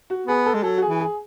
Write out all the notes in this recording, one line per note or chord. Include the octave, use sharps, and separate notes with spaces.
F#4
B3 G#4
A4
G#3
F#3 A4
F#4
G#4
E3
G#4